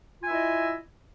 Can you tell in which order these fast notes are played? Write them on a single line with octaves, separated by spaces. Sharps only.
F4 G#5 E5 E4 D#5